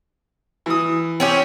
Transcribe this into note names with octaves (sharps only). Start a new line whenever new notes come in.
E3 D#6
C4 C#4 G4